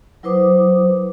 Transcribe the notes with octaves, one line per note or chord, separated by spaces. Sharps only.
F#3 E4 B4 C5 D6 D#6